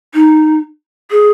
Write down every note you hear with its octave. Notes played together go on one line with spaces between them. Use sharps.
D#4
G#4